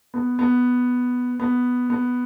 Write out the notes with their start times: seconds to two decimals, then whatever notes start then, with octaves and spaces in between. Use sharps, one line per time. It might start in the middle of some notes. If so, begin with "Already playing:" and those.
0.14 B3
0.39 B3
1.40 B3
1.90 B3